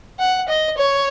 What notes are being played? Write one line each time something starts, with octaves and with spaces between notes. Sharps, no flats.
F#5
D#5
C#5